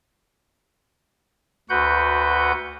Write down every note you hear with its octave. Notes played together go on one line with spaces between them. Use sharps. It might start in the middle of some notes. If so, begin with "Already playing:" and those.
D2 F#4 B4 F#5 G6